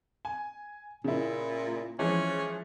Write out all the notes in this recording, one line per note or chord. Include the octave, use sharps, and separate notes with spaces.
G#5
A#2 C#3 E4
E3 F3 G#3 C#4